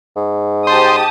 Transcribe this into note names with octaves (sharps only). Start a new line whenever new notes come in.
G#2
G4 C5 A5 D#6